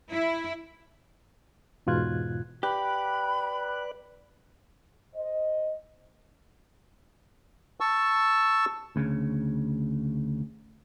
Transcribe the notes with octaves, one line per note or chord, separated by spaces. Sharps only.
E4
E2 G#2 B2 F4 F#6 G#6
G4 B4 D5 B5 F#6
C5 D#5
A5 C#6 E6
D2 C#3